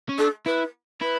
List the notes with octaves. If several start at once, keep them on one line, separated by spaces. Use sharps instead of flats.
C#4
D4 A4
E4 B4
E4 B4